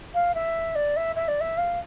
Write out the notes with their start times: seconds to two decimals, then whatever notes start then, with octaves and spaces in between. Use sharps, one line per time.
0.14 F5
0.34 E5
0.75 D5
0.96 E5
1.16 E5
1.28 D5
1.40 E5
1.57 F5